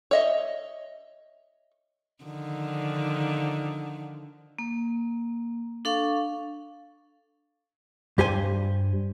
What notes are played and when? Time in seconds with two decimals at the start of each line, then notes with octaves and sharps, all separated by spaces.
0.11 C#5 D#5 E5
2.24 D3 D#3 F3
4.59 A#3
5.85 D4 A4 F5 C#6
8.18 G2 G4 C5 G#5